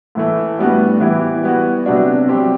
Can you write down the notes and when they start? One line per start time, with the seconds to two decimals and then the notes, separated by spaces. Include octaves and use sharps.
0.15 A2 E3 A3
0.58 A2 G3 B3 D4 F#4
1.00 E3 B3 E4 G4
1.43 G3 B3 F#4
1.86 C3 F#3 B3 D4 F#4
2.28 G3 C4 G4 C5